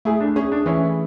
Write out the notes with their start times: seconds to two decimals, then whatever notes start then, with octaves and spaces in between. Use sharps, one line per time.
0.05 A3 E4 G#4
0.20 D4
0.36 C#4 G#4
0.52 D4
0.66 E3 C#4 E4